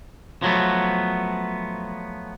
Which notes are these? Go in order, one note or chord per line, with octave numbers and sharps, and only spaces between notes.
F3 F#3 A3 B3